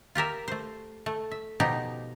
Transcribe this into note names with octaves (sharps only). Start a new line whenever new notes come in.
F4 G4 A#4 E5
A3 C5
A3
E5
B2 F3 D#4 G4